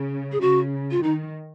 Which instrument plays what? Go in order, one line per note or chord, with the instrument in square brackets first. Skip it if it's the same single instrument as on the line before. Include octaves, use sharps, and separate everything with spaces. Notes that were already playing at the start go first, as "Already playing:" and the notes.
Already playing: [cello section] C#3
[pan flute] G#4
[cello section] C#3 [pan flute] F#4
[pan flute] F4
[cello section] D#3 [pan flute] D#4